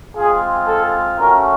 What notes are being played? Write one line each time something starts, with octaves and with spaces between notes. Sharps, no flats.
G#3 C4 F4 G#4
A4
A3 C#4 F#4 A#4